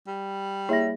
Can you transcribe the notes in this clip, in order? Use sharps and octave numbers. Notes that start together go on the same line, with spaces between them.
G3
A#3 E4 G#4 C#5 E5 A#6